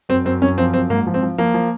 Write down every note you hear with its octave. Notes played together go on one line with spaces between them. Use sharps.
F#2 C4
F#2 C4
F#2 C#4
F3 C4
F#2 C4
G#2 A#3
F3
C4
F3
F3 A#3
F3